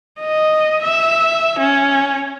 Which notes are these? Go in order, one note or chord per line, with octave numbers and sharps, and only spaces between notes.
D#5
E5
C#4